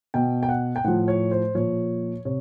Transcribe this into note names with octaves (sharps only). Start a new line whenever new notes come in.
B2 G5
G5
F#5
G5
A2 F3 F#5
C#5
C5
A#2 F3 C#5
C3 C#5